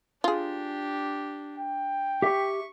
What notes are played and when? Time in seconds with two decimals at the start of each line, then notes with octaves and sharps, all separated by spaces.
0.24 D4 F4 G4 G#4
1.58 G5
2.22 G4 E5 C#6